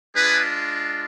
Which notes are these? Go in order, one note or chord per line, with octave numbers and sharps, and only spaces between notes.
G#3 D4 F4 G#4 B4